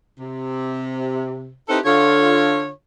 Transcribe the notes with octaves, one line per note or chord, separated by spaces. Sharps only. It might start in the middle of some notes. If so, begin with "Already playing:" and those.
C3
C4 D#4 E4 G4 A4 B4
D3 F4 C#5